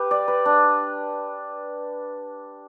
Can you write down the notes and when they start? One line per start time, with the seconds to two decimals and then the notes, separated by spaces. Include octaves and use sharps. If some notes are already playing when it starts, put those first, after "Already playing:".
Already playing: G4 B4
0.11 D5
0.28 B4
0.45 D4